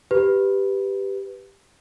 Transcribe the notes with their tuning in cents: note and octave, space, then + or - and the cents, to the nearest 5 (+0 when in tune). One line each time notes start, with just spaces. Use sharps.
G4 +0 B4 +0